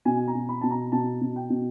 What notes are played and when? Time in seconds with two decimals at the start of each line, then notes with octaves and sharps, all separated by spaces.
0.05 B2 G#5
0.27 A#5
0.35 B2
0.49 B5
0.61 B2 A5
0.70 A#5
0.92 B2 A5
1.21 B2
1.36 G5
1.50 B2